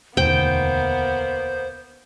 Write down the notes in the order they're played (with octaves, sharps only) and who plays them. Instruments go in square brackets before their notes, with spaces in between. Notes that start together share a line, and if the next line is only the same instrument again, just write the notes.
[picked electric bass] E1 D2 D#3 [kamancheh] A#3 B3 [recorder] C5 [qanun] G5